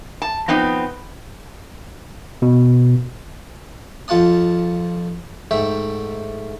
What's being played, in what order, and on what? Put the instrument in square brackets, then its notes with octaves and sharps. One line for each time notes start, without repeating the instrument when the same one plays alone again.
[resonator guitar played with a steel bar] A5
F3 B3 C4 D#4
[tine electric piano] B2
[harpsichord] F2 F4 F#5 A5 D#6
G#2 A3 E5 G5